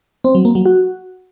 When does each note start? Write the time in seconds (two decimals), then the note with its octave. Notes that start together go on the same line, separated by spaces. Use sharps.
0.24 C4
0.35 F#3
0.45 A#3
0.55 F#3
0.65 F#4